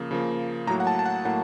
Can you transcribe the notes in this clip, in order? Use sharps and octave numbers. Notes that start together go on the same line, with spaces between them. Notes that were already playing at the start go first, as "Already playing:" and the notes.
Already playing: C#3 F3 A#3
C#3 F3 A#3
A2 F#3 A#3 A#5
F#5
A5
A5
F#5
A2 F#3 A#3 F#5